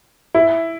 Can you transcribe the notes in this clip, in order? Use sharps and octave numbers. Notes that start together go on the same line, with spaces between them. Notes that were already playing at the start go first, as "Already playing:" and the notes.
E4